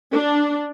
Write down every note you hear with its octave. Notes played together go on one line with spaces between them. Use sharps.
D4